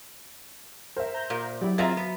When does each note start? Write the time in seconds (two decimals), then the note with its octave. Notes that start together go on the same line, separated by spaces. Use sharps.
0.96 A#4 C5 E5
1.14 A#5 G6
1.30 A#2 A#4
1.61 F#3 E4 G4 D5
1.78 F#3 C4 F4 G#4 D#5 E5 A#5 A6
1.97 B3